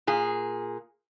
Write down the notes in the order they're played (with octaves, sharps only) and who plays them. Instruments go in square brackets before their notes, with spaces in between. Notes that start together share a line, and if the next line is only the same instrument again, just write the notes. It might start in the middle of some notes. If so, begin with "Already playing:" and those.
[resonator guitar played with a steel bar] A#2 G#4